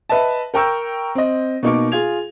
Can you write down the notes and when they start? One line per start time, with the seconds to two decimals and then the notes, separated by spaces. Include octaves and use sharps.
0.09 B4 D#5 E5 A5
0.54 A#4 G5 A#5 C#6 E6 G6
1.15 C4 D#5
1.63 B2 A#3 D#4 A#4 C#6 D6
1.92 F4 G#4 G#6 F7